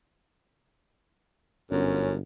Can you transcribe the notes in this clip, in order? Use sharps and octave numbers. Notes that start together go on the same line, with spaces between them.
G1 F#2 C#4